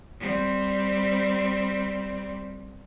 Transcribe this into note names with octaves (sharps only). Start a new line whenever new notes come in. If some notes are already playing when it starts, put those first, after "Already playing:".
G3 C4